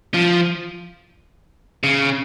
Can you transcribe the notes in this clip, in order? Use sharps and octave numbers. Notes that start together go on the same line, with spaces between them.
F3
C#3